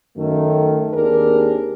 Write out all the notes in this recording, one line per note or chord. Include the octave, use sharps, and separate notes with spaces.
F#2 D#3 A3
D#2 C4 D4 G4 G#4 A#4